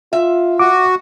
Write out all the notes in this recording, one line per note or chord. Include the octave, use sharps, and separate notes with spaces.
F4 E5
F#4 D6